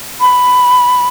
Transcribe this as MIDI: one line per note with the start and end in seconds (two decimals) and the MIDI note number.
0.20 1.08 83